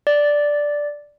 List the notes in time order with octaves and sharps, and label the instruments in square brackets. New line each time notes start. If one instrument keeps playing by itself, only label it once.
[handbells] D5